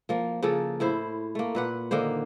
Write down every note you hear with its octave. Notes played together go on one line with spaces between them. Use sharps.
F3 A#3
C#3 F3 A#3 A4
A2 E4 C5
A3 A#3
A#2 B4 F#5
D3 D#3 A#3 C5